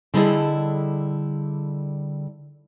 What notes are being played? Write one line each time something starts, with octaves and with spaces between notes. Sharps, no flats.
D3 G3 E4 G#4 A4 D#5